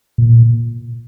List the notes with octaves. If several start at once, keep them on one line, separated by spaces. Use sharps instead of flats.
A#2